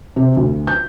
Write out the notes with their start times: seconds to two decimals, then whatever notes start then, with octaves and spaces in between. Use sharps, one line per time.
0.16 C3
0.37 D2
0.67 G6